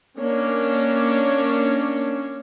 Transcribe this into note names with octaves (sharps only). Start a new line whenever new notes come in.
A#3 C#4 D4 C#5